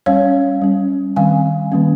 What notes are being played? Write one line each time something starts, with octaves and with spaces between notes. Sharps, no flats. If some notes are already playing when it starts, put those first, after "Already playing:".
G3 C#4 C#5 F5
G3 C#4
D#3 G3 C4 F5 G#5
D#3 G3 A#3 C#4